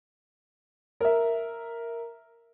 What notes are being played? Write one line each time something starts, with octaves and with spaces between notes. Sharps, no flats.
A#4 E5